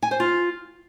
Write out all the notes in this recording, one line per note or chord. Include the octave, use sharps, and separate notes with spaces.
G#5
C5
F4